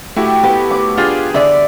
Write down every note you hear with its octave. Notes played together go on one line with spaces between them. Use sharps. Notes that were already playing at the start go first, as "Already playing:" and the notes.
A3 E4 F#4 G4
B3 G4
D6
D4 F4 G4 G#4
D3 D5 E5